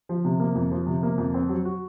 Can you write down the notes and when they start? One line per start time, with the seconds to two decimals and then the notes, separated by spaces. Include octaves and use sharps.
0.09 F3
0.25 C3
0.40 A#3
0.55 F2
0.71 F3
0.86 C3
1.03 A#3
1.18 F2
1.34 C4
1.49 F#3
1.65 F#4